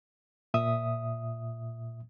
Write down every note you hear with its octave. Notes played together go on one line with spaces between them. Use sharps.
A#2 E5 D#6